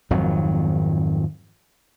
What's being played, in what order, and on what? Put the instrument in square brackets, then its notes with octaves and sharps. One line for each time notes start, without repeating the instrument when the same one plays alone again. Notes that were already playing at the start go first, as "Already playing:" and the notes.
[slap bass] G#1 F2 D#3 F#3